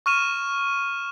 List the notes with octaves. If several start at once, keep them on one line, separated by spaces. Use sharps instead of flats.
C#6 F6 D#7 E7